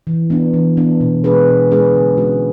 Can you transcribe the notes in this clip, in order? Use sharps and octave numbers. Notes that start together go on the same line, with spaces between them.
E3
B3 D4
E3
B3 D4
B2
G#3 D4 G#4 B4
B2
G#3 D4 G#4 B4
D3
G#3 C#4 F#4